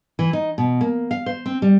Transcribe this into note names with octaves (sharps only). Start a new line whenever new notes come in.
E3
D#4
B2
A#3
F5
C5
C4
G3